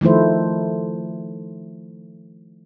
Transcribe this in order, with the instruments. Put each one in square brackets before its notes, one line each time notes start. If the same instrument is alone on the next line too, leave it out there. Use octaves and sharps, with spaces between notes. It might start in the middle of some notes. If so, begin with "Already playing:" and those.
[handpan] D#3 F3 A3 E4 C5